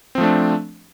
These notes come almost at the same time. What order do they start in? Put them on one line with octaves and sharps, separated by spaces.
C4 F3 A3 D4